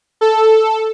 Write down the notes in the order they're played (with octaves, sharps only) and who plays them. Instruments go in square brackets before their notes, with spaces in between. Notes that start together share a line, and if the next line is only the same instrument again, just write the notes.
[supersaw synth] A4